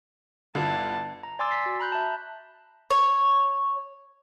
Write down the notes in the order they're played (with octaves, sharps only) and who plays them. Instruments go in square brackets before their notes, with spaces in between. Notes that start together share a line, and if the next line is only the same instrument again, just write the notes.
[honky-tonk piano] G1 D3 F4 [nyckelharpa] E4 A5
[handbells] A#5
D5 G#5 C6 D6 E6 A6
B6 C7
F#4
A#5 B5 F#6 G6
E5 A5
[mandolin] C#5